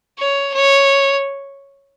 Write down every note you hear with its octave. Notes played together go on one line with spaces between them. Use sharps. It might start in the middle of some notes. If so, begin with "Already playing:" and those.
C#5
C#5